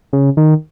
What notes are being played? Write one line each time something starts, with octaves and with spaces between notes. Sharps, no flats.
C#3
D#3